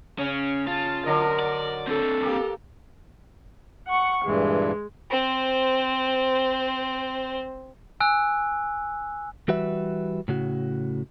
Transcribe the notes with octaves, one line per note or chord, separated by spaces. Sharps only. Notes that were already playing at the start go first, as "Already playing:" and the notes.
C#3 C#4
F4 A5
D3 F#3 A#4 D#5
D5
C4 D4 A4
A#3 G4
F#5 C#6
G2 A#2 E3 G#3
C4 C5
G#5 E6 F#6
E3 G3 F#4 B4 E5
A2 C#3 F#4